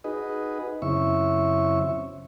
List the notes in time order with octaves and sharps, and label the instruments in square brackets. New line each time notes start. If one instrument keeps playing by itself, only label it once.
[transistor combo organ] D#4 F#4 G#4 B4 D#5
F#2 C#3 C4 E4 E5 C#6